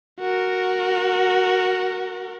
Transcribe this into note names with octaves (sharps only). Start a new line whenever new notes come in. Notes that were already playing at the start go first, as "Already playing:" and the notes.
F#4 A#4